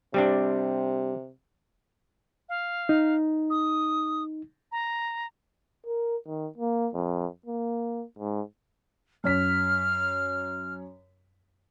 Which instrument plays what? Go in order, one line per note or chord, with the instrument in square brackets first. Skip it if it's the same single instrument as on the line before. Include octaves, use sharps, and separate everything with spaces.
[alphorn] C3 [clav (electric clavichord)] G3 C4 D4
[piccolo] F5
[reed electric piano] D#4
[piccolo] D#6
A#5
[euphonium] A#4
D#3
A#3
F2
A#3
G#2
[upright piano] F#2 C#5 B6 [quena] F6